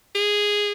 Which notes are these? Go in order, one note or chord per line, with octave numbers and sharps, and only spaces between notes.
G#4